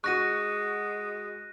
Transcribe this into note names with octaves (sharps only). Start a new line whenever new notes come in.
G#3 F#4 C#6 F#6 A#6 D#7